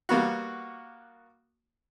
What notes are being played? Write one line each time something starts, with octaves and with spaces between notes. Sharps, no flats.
G3 A#3 B3 F#4